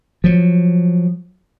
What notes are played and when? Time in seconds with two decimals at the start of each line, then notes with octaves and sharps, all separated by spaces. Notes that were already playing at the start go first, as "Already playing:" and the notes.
0.24 F3 F#3